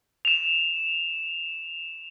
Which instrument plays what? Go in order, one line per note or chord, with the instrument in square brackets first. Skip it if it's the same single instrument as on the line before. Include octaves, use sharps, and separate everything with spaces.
[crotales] E7 F7